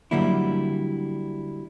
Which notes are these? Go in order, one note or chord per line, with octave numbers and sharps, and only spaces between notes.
D3 F#3 G3 A#3 E4